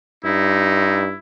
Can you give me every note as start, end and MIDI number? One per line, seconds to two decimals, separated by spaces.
0.25 1.14 43
0.25 1.12 63
0.25 1.18 64